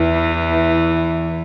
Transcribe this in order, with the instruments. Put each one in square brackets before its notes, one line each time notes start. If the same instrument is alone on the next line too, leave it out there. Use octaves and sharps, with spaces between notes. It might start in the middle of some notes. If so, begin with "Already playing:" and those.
Already playing: [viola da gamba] E2 E3